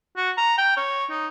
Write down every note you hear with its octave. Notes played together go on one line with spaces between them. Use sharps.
F#4
A#5
G5
C#5
D#4